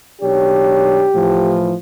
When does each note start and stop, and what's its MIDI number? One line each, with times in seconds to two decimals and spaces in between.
0.21 1.06 35
0.21 1.06 62
0.21 1.55 67
0.21 1.06 73
1.14 1.74 45
1.14 1.74 52
1.14 1.74 53